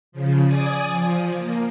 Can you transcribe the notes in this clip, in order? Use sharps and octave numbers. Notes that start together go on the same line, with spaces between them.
C#3 F3
D5 G#5 D#6
F3
A#3